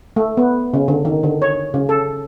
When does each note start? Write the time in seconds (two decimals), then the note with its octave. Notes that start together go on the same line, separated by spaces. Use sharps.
0.16 A3
0.37 B3
0.74 C#3
0.88 D3
1.05 D#3
1.23 D3
1.42 C#5
1.74 C#3
1.89 A4